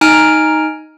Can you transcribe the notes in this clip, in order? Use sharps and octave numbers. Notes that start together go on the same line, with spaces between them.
D#4 G#5 A#5 F6 D7